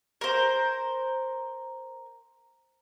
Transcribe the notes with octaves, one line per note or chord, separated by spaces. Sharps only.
A#4 C5